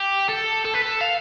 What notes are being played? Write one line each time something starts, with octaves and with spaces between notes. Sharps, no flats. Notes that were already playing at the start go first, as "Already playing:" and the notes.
Already playing: G4
A4
A4
B4
A4
F5